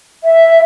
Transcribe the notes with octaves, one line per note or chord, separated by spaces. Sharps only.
E5